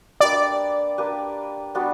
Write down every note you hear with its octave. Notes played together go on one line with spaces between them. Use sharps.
A#3 D4 G4 B4 D5
A#3 D4 G4 B4
G3 B3 D4 F#4